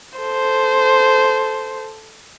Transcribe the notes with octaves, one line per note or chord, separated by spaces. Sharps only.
A4 C5